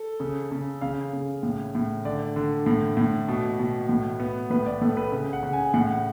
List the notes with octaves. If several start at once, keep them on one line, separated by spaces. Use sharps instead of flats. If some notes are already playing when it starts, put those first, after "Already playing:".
Already playing: A4
C#3
C#3
C#3 F5
C#3
A2
A2
D3 D5
D3
A2
A2
B2
B2
A2
B3
A2 B4
D5
A2 A4
B4
C#3
F#5
C#3
G#5
A2 F#5